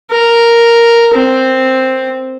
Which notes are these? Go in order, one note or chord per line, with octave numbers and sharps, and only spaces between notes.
A#4
C4